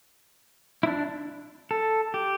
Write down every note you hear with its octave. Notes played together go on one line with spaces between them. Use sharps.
E4
D4
A4
G4